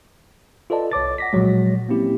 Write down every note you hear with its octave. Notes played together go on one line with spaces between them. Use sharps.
F4 A4 B4 D5 D#5 A5
C2 C#5 D6 A6
F#5 A#6 B6
A#2 F3 F#3 G#3
A#3 C4 C#4 E4 G4